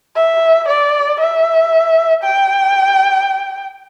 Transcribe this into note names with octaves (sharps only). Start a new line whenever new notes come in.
E5
D5
E5
G5